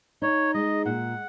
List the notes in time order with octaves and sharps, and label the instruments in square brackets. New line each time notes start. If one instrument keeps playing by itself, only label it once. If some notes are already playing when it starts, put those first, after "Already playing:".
[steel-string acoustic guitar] D#4 [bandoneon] C#5
[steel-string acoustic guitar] G#3 [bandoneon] D#5
[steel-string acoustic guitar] A#2 [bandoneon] F#5